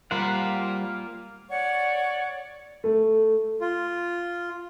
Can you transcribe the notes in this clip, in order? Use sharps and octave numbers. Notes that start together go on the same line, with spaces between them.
G3 A#3 F4 A#4 C5 F#5
C#5 D5 F#5 C#6
A3
F4